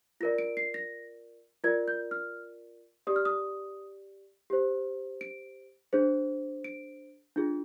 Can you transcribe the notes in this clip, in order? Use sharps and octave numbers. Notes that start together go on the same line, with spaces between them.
F4 A#4 D5 A#6
D7
C7
A#6
F4 A#4 D5 G#6
G6
F6
G4 D5 D#6
F6
D#6
G4 C5
D7
D4 G#4 C5
D7
D4 F4 G#4